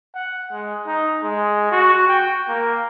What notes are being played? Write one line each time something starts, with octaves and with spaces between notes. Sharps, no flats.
F#5
G#3
D#4
G#3
F#4
G5
A#3